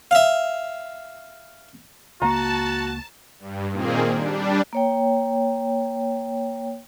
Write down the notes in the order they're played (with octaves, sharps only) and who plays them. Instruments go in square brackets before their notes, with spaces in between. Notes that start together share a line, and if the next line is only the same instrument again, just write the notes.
[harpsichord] E5 F5
[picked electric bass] C#2 A#3 [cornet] F#4 [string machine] A5 [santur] A#5
[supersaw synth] G2
A#2 D#3 A#3 C4 G#4
G3 D4
[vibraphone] A#3 C#5 G5